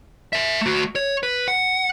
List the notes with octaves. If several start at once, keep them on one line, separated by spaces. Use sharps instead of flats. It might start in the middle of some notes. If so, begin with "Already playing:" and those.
A#4 E5
A3 F#4
C#5
B4
F#5